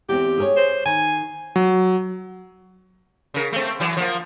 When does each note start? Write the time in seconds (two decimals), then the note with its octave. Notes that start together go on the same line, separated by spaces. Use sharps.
0.09 E2 C4 G4
0.38 G#4 A#4 C#5
0.56 C5
0.86 D#3 G#5
1.56 F#3
3.34 C#3 A#4
3.53 A3 C4
3.80 E3 F#3
3.97 F3 A#3